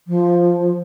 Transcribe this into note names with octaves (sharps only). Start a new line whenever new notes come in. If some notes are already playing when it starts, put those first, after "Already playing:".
F3